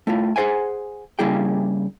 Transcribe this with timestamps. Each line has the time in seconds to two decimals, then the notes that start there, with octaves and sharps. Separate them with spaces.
0.07 A3 E4 F4
0.36 G#4 A4 C5 F#5 G#5
1.19 C#3 G3 A#3 E4 G#4 G5